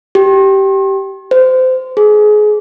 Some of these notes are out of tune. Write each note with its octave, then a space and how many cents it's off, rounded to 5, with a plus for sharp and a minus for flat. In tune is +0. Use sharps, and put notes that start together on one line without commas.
G4 -15
C5 -25
G#4 +25